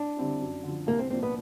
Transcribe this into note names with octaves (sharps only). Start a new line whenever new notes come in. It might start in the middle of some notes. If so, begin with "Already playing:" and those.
Already playing: D4
D3 G3 C4 E4
F#2
D3 F3
C2 A#3
C4
A#2 F3 A#3 C4 D4
B3